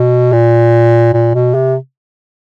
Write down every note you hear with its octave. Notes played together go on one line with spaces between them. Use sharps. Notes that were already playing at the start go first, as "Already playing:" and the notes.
Already playing: B2
A#2
A#2
B2
C3